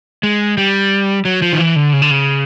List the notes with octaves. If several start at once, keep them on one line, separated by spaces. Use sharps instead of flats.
G#3
G3
F#3
F3
D#3
E3
D3
C#3
D3
C#3